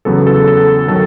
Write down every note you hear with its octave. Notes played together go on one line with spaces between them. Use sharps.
E2 C#3 F#3 B3 A4
A4
A4
D#3 F#3 A4